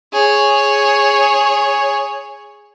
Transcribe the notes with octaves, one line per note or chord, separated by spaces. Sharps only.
G#4 C#5